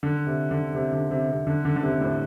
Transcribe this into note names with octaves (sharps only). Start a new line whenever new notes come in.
D3
C3
D3
C3
D3
C3
C3
D3
D3
D3
C3
A2